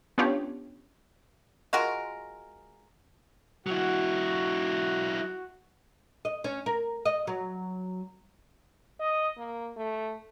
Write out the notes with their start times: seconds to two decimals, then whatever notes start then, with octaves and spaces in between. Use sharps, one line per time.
0.18 B3 C#4 D4 F4 G4 C#5
1.73 G#3 F4 F#4 A#4
3.66 F#3 E4 F#4
6.25 D#5
6.44 C#4
6.66 A#4
7.05 D#5
7.27 F#3
9.00 D#5
9.37 A#3
9.76 A3